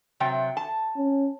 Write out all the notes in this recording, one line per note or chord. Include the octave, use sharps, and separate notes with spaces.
C3 F#3 G5
A5
C#4